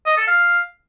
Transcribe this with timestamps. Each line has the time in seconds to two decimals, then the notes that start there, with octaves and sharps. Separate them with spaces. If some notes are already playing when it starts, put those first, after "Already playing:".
0.06 D#5
0.17 A4
0.28 F5